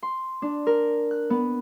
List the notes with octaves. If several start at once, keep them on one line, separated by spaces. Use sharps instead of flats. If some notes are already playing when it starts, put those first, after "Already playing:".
C6
D4
A#4
F#6
B3